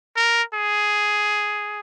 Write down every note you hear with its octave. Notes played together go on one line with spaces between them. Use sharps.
A#4
G#4